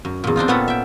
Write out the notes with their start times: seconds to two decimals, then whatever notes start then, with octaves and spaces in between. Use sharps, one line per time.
0.05 F#2
0.24 E2 A#2
0.36 C4 D4 D#4 F4
0.48 A#2 B3 C#4 A4 F#5 B5
0.68 E5 G5